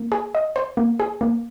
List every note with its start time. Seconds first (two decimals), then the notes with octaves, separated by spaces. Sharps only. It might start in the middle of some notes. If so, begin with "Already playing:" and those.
Already playing: A#3
0.12 G#4
0.35 D#5
0.56 C5
0.77 A#3
1.00 G#4
1.21 A#3